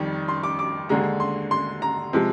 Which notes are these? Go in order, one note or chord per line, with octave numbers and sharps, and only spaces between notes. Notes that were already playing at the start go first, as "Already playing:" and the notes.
Already playing: F2 D#3 G3
C6
D6
D6
D#2 D3 G#3 A#5
C6
C6
A#5
C3 F3 G#3